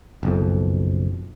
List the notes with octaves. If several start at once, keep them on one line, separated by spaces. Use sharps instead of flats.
F#1 B1 F2